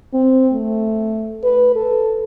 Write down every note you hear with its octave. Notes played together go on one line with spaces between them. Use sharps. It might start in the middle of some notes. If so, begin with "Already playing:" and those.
C4
A3
B4
A4